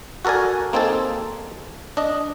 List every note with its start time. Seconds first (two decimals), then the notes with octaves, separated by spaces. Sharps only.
0.25 F#4 A4 A#4 D5 G#5
0.73 A#3 C4 D#4 G#4 A4
1.97 D4 D#5